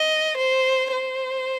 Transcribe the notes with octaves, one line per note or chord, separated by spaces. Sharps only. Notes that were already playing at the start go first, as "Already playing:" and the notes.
Already playing: D#5
C5
C5